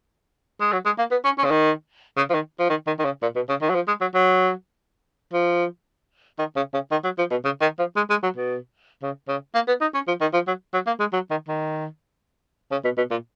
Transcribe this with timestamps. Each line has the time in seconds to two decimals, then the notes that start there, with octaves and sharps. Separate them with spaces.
0.61 G#3
0.72 F#3
0.85 G#3
0.98 A#3
1.11 B3
1.25 C#4
1.38 C#4
1.44 C#3
1.51 D#3
2.17 C#3
2.30 F3
2.34 D#3
2.59 F3
2.69 D#3
2.87 D#3
2.99 D#3
3.05 C#3
3.22 A#2
3.35 B2
3.49 C#3
3.61 D#3
3.69 F#3
3.75 F3
3.88 G#3
4.01 F#3
4.14 F#3
5.33 F3
6.39 D#3
6.56 C#3
6.74 C#3
6.91 D#3
7.04 F#3
7.18 F3
7.31 B2
7.45 C#3
7.61 D#3
7.79 F3
7.97 G#3
8.10 G#3
8.23 F#3
8.36 B2
9.02 C#3
9.28 C#3
9.55 A#3
9.68 B3
9.81 D#4
9.94 C#4
10.07 F3
10.21 D#3
10.34 F3
10.47 F#3
10.74 F#3
10.87 A#3
11.00 G#3
11.13 F#3
11.30 D#3
11.48 D#3
12.71 C#3
12.84 B2
12.97 B2
13.11 A#2